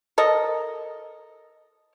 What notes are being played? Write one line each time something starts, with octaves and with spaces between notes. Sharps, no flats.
A4 A#4 D#5